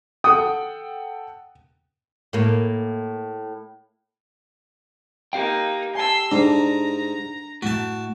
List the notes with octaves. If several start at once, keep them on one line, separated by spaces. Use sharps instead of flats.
A4 F#5 G5 D#6
A2 A#3
A#3 D#4 G4 F5 G5
G#5 A5 C6 E6
G#2 D4 A#5
A2 A3 F#4 A5